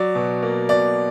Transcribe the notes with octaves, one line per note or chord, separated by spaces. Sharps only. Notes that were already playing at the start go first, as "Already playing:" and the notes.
Already playing: F#3 D5
B2
A#3
B2 D5